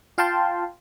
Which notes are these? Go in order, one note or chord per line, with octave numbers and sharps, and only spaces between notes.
F4 F5 G5 A5 C6